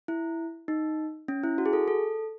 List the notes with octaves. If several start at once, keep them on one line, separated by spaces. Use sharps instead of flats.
E4
D#4
C#4
E4
F#4
G#4
A4
A4